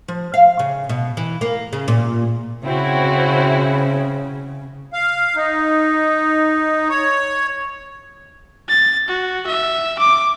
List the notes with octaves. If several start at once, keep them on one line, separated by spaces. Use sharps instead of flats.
F3
F5
C#3
B2
E3
A#3
C#3
A#2
C#3 C4 E4 F#4
F5
D#4
C#5
A6
F#4
E5
D6